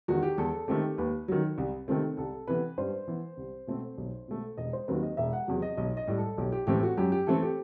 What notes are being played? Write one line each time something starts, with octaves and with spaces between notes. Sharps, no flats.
E2 D#3 F#4
G4
E2 A4
D#3 A3 C4 G4
D#2 B4
D#3 F#3
C2
C3 D#3 A3 C4
C2 A4
C3 E3 B3 B4
G2 C5
E3 B3
C2
B2 A3 C4
B1
B2 A3
E1 D#5
C5
D#2 D#3 F#3 C4 B4
D#5
E1 E5
F#5
E2 C3 F#3
D#5
B1 D#5
D#5
A2 G3
A4
B1 G4
G4
A2 E3 A3 C4 G4
F#4
F#2 G4
G4
E3 A3 C4 A4
G4